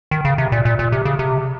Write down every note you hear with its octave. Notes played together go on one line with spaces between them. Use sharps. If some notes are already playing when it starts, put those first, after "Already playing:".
D#3
C#3
C3
A#2
A#2
A#2
C3
C#3
C3